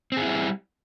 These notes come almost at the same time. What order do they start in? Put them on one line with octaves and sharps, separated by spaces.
C4 G#4 E4 G3